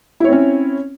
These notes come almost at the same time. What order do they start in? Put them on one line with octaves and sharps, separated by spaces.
E4 C#5 C4 C#4